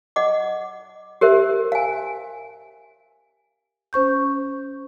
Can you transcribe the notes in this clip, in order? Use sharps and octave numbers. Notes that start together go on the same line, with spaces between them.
D#5 F#5 D6
G4 A#4 C5 E5
F5 G#5
C#4 C5 C#6 G6